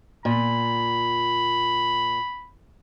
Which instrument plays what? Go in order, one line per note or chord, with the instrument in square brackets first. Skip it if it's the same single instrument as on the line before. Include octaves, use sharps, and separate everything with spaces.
[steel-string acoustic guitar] A#2 [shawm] B5